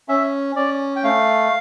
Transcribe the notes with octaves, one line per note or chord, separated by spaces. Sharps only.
C#4 E5
C#4 D5
G5
A3 F5